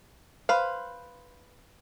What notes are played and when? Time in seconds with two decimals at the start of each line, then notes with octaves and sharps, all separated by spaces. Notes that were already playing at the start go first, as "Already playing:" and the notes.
0.49 B4 C5 F5